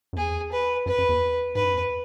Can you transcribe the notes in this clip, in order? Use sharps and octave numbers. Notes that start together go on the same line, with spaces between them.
F#2
E2 G#4
B4
F#2 B4
F#2
E2
G#2 B4
F#2
E2